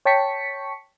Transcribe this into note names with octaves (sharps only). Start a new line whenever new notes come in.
C#5 G5 A5 C#6 B6 C#7